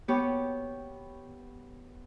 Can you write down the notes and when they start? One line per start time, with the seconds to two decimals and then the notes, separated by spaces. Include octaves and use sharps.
0.08 B3 G4 C#5